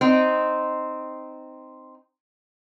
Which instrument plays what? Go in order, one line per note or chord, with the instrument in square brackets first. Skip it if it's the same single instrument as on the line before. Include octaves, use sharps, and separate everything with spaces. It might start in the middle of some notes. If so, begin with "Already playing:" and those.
[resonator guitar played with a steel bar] C4 D#4